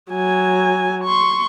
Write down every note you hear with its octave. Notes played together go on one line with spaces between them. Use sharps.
F#3 G#5
C6 C#6